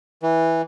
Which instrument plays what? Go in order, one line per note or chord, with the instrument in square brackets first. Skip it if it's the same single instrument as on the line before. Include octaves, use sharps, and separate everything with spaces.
[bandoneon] E3